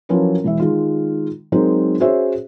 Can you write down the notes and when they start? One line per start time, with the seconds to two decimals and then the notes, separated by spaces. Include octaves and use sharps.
0.09 F3 F#3 C#4 E4 A#4 B4
0.44 E1 E3 E5
0.60 D#3 G#3 F4
1.52 F#3 G#3 C4 D#4 A#4 C5
2.00 C#4 F#4 G#4 C5 C#5 E5